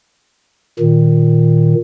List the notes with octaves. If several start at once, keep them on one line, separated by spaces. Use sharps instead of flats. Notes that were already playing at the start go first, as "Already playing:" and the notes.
A#2 D#3